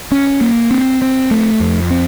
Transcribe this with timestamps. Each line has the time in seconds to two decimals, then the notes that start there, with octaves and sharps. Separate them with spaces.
0.12 C#4
0.41 A#3
0.71 C4
1.02 C4
1.31 A3
1.60 F2
1.91 C4